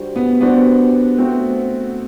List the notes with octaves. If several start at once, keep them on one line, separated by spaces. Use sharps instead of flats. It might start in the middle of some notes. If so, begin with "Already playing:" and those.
Already playing: G3 D4 F#4 C5
B3
G3 B3 D4 F#4 C5
A3 C4 F#4 C5